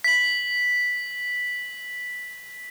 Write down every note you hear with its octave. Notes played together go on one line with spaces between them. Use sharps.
B6 F#7